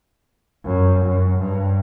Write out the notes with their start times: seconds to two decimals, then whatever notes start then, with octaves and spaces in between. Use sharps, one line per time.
0.64 F#2
1.05 F#2
1.38 G2